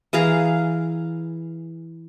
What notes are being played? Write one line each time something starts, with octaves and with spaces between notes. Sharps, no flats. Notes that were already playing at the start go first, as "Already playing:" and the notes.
E3 G#4 F5 A#5